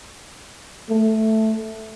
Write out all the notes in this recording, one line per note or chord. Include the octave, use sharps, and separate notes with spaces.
A3